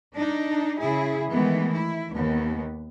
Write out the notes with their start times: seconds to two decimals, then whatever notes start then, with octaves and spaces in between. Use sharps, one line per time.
0.14 D4 D#4
0.80 C#3 E4 G#4
1.31 D#3 E3 G#3 A3 B3
1.73 E4
2.13 D#2 B3